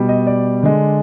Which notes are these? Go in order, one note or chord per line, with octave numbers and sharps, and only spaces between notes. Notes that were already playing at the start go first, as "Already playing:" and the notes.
Already playing: B2 G3
D#5
D5
D3 G#3